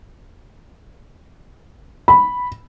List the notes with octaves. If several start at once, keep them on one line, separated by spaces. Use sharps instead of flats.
B5